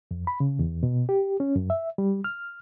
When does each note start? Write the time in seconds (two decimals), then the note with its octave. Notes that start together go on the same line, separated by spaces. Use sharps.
0.11 F2
0.27 B5
0.40 C#3
0.59 E2
0.83 B2
1.09 G4
1.40 C#4
1.56 F#2
1.70 E5
1.98 G3
2.24 F6